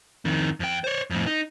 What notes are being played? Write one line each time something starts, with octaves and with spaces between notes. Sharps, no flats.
F2 D#3
F2 G5
C5 C#5
F2 A2
D#4